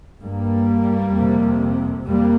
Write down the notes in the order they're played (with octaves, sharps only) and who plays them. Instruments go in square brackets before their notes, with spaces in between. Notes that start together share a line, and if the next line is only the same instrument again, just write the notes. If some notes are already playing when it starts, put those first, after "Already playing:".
[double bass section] G2 G3 A#3
F2 C3
F2 G3 A#3